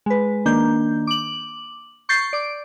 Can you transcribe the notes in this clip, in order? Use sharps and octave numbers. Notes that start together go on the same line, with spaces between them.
G#3 B4
D#3 A#3 D4 G6
D6 F#7
C#6 G6 A6 C7
D5 D6